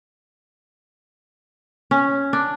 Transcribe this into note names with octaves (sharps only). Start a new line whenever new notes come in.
C#4
D4